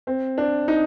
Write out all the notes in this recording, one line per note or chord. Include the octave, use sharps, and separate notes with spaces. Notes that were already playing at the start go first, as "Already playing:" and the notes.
C4
D4
D#4